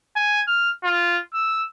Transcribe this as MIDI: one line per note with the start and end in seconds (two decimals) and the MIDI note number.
0.16 0.41 80
0.47 0.71 89
0.84 1.19 65
1.34 1.65 88